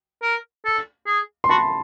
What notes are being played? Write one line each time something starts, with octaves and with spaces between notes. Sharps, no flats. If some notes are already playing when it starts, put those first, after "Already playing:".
A#4
A4
G#4
C6
F#4 A5 B5